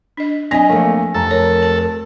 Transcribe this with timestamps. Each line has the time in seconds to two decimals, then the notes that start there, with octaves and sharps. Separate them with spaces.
0.17 D4 D#5
0.51 F#3 C4 D4 D#5 G#5 A#6
0.70 F3 A3 A#3
1.14 F1 A4 A#5
1.31 A#4 C#5
1.63 A5